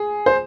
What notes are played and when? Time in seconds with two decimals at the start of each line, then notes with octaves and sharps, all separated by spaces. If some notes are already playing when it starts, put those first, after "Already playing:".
Already playing: G#4
0.26 C5